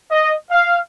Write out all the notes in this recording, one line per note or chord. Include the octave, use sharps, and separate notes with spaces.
D#5
F5